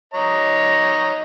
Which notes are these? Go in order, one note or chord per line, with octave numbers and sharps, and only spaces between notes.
C#5 D#5 A#5